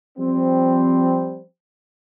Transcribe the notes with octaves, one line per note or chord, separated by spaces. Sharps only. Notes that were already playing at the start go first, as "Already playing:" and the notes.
F3 G3 C4